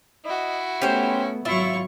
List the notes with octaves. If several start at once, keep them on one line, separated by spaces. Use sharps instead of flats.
E4 F#4 D#5
A3 B3 C#4 G4 C5
G#1 F#3 E4 F4 E5 C#6